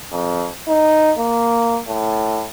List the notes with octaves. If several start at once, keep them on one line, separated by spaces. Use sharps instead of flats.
F2
D#4
A#3
A2